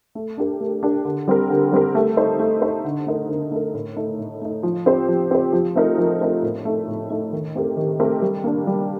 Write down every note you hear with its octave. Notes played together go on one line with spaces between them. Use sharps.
A3
D4 G4 A#4
A3
D4 G4 A#4
D3
G3 C4 G4 A#4
D3
G3 C4 G4 A#4
A3
D#4 A4 C5
A3
D#4 A4 C5
D3
A3 D#4 A#4
D3
A3 D#4 A#4
A2
A3 D#4
A2
A3 D#4
F3
C4 G4 C5
F3
C4 G4 C5
F3
A3 C4 D#4 A#4
F3
A3 C4 D#4 A#4
A2
A3 D#4 A4
A2
A3 D#4 A4
D#3
A3 C4 G4 A#4
D#3
A3 C4 G4 A#4
G3
A#3 D4
G3